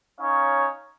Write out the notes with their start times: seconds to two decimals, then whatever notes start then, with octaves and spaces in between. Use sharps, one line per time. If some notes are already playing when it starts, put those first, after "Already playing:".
0.20 C#4 D#4 C#5 F5